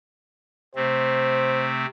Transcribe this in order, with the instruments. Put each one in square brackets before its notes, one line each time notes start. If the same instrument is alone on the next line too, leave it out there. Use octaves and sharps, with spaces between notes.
[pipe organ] C3 A3 C4 [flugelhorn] C5